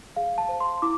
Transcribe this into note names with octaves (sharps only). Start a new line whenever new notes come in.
G#4 F5
A5
C5
C6
E4 D6